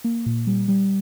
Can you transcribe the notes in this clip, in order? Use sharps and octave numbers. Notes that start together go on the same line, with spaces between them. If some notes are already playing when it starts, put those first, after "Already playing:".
A#3
A#2
G3
G3